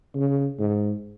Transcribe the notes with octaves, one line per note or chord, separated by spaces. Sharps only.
C#3
G#2